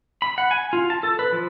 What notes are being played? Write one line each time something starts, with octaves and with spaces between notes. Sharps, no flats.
B5
F#5
G#5
F4
A5
A4
B4
F3